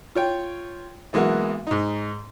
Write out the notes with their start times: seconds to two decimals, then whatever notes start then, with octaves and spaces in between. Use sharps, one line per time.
0.15 F4 C#5 G5
1.13 B1 E3 G#3 A#3 B3 F#4
1.67 G#2 D#4